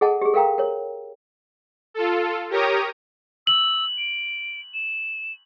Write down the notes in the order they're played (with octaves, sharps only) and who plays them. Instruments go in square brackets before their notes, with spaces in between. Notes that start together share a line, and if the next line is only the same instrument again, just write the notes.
[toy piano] G#4 A4 D#5 F#5 A5
G4 G#4
A4 A#4 F5 G5 A#5
A#4 C#5
[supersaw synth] F4 A4
G4 A#4 C#5 A#5 D#6
[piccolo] E6 [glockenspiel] F#7
[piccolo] D7
E7